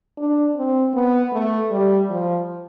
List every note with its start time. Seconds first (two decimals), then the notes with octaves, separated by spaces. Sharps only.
0.18 D4
0.56 C4
0.94 B3
1.33 A3
1.71 G3
2.10 F3